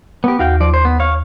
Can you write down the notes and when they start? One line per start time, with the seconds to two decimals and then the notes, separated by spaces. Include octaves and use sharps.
0.24 B3 G4
0.39 D#2 F#4 F5 G5
0.60 F3 D5
0.74 C5
0.85 B3
1.00 C#5 F5